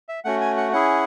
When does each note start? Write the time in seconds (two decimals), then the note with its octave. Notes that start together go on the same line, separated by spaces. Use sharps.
0.09 E5
0.24 A3 C#4 F#4 F#5
0.41 G#5
0.57 F#5
0.72 C#4 E4 G#4 F#5